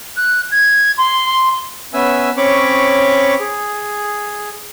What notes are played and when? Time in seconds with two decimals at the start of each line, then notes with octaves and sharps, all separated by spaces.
0.17 F#6
0.51 G#6
0.98 C6
1.93 B3 C#4 B4 E5 G#5 E6
2.37 C4 C#4 C#5 B5 C#6 D6
3.40 G#4